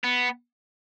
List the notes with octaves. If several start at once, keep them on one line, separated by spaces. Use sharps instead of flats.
B3